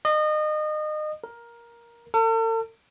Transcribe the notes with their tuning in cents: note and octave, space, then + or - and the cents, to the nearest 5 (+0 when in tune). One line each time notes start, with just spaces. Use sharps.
D#5 -30
A#4 +10
A4 +45